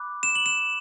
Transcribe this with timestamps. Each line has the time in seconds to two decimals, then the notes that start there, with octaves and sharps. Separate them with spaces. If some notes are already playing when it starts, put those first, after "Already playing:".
Already playing: B5 D6 F#6
0.23 E7
0.36 F#7
0.46 E7